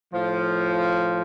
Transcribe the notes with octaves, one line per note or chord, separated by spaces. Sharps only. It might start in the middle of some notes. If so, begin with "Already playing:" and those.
A2 F3